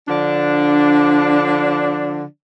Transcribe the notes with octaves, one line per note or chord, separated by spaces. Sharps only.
D3 F3 D4